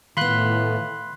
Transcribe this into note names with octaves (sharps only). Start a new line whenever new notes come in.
A2 D#3 B3 F4 B5 C6 F#6